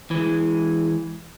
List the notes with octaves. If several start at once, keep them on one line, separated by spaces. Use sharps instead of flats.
E3 G#3